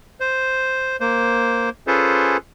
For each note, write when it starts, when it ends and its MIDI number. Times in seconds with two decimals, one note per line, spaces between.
0.20 0.96 72
1.01 1.69 58
1.01 1.69 72
1.87 2.37 61
1.87 2.37 65
1.87 2.37 68
1.87 2.37 69
1.87 2.37 71
1.87 2.37 72